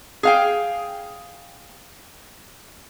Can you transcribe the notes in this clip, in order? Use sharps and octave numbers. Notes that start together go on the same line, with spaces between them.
G#4 F5 G5